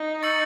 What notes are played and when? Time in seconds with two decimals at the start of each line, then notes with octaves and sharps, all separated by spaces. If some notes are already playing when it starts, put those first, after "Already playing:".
Already playing: D#4
0.23 C#6 E6 A6 C#7 F#7